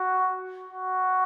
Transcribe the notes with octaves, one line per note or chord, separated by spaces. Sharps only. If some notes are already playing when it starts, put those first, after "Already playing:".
Already playing: F#4
F#4